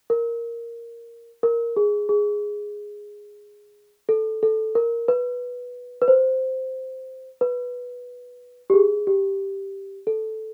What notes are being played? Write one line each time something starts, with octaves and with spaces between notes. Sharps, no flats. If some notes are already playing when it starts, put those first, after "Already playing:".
A#4
A#4
G#4
G#4
A4
A4
A#4
B4
B4
C5
B4
G4
G#4
G4
A4